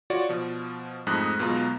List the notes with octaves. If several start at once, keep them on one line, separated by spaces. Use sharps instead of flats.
F4 F#4 C#5 D5
B2 F3
F2 G#2 A3 D#6 F#6
B1 B2 G#3 B3 F4 A#5